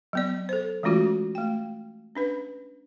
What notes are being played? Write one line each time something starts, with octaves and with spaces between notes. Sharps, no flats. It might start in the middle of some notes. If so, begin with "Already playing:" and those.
F#3 B3 D5
A4 C5
E3 G#3 A3 C#4 F4 F#4
A3 G5
C#4 D4 B4